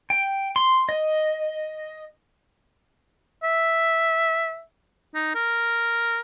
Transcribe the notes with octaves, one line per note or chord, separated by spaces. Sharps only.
G5
C6
D#5
E5
D#4
A#4